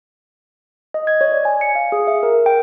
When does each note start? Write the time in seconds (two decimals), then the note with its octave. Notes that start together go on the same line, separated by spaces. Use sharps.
0.94 D#5
1.07 G#6
1.21 C#5
1.32 D5
1.45 G#5
1.61 C#7
1.75 F5
1.92 G#4
2.07 E5
2.23 A#4
2.46 G5